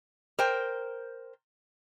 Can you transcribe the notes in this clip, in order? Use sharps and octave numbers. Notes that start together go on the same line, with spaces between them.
A#4 C5 G5